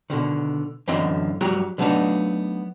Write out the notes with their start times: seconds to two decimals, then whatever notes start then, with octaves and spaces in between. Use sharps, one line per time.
0.10 B2 D3 D#3
0.88 F#2 D3 E3 C4 D#5 E5
1.41 G2 F#3 G3 F#4 G4 A#5
1.78 D3 F#3 A3 B3 D4 D#4